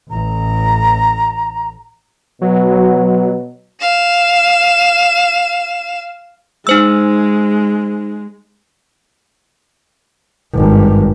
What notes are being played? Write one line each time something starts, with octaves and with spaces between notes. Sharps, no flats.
A1 A#5
B2 F#3
F5 E7
G#3 D#4 C5 E6
G#1 G2